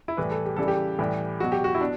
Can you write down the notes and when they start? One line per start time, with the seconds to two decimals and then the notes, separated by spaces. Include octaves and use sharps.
0.08 E4
0.17 A2 E3 G3 B4
0.31 A4
0.46 G4
0.56 C#3 E3 G3 A4
0.68 G4
0.99 A2 E3 G3
1.40 B2 F#3 F#4
1.52 G4
1.64 F#4
1.75 E4
1.81 B2 D4